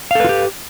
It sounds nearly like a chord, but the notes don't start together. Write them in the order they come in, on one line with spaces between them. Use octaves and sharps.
F5 A4 B4 F4 G4